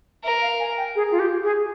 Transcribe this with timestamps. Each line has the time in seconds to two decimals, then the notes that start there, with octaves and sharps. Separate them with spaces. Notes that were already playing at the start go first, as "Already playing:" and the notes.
0.24 A#4 E5
0.42 F5
0.60 G#5
0.77 G5
0.96 G#4
1.12 F4
1.19 G4
1.44 G#4